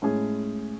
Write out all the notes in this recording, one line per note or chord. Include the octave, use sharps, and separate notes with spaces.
A2 G#3 C#4 G#4